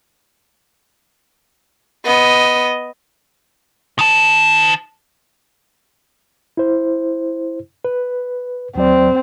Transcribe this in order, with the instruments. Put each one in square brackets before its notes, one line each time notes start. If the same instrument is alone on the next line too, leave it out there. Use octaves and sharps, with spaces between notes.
[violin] B3 D#5
[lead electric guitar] D#3 A5
[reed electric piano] E4 C5
B4
[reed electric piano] D#2 F#3 D5 [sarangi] C4